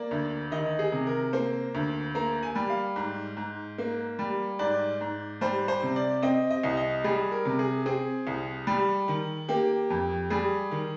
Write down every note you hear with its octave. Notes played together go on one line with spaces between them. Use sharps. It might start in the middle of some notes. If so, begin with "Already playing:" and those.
Already playing: A#3 D5
D2
D#3 D#5
G#4
C3
A#4
A#3 C5
D2
A#3 A#5
G#5
G3
F5
G#2
G#2
A#3
G3
G#2 D5
G#2
G3 C5
C5
C3
D5
C4 D#5
D#5
C2
D#5
G3 G#4
A#4
C3
G#4
C4 G#4
C2
G3
D#3
A#3 G4
F2
G3 G#4
D#3